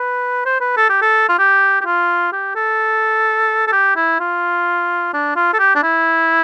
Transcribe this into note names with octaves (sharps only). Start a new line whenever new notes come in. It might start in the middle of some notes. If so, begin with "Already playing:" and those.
Already playing: B4
C5
B4
A4
G4
A4
F4
G4
G4
F4
G4
A4
A4
G4
E4
F4
D4
F4
A4
G4
D4
E4